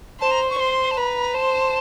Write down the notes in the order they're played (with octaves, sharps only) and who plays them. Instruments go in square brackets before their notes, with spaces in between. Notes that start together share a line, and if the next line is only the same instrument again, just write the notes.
[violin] C5 [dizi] A5
[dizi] A#5
C#6
[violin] C5 [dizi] C6
[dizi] A5
[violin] B4 [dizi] A#5
[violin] C5 [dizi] A5